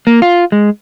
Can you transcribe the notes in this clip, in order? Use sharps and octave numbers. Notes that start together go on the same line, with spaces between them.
A#3
F4
G#3